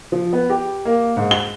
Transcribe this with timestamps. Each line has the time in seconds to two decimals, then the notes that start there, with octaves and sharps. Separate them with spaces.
0.12 F3
0.33 B3
0.50 G4
0.85 A#3
1.17 G#2
1.31 G7